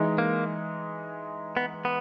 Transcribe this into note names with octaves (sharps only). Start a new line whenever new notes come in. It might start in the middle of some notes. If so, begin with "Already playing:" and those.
Already playing: E3 G#3 D#4
A#3
B3
B3